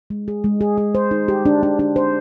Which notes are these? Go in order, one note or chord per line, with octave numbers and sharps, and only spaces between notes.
G#3
G#4
G#3
G#4
G#4
C5
D#4
G4
D4
D4
D4
C5